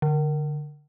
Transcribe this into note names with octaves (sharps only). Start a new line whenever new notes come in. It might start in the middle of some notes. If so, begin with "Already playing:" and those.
D3